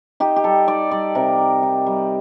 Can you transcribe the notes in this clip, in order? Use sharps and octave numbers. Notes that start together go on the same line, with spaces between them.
D#4 G4
G4
G3 A4
D#4 D5
G3 D5
C3 A#4
D#4
D#4
G3